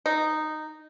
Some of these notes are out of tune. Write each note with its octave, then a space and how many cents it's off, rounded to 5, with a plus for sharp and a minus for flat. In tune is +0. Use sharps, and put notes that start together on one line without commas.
D#4 -10